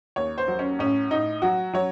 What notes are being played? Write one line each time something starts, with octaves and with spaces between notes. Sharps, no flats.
D#2 C#5
C5
F#3
C#4
A2 C#4
A2 D#4
F#3 F#4
F#3 C#5